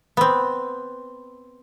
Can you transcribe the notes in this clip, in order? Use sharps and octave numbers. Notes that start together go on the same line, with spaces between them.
B3 C4